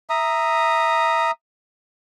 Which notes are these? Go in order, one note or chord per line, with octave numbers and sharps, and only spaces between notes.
E5 A#5 D#6